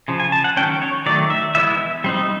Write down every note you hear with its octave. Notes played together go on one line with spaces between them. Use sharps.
C#3 F3
G#5
A5
F#5
D#3 F#3 A3 C#4 G5
C#5
D#3 F#3 A3 D5
E5
E3 G#3 B3 E4 E5
G3 C4 D#4